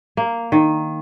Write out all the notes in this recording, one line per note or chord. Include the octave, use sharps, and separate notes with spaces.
A#3
D#3